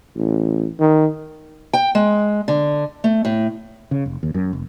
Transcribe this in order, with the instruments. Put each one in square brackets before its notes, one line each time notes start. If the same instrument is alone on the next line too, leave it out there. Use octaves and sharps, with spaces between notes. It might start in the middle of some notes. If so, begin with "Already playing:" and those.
[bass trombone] A1
D#3
[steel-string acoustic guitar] G5
G#3
D3
A3
A2
[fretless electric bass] C#3
F1
D#2
F#2
F1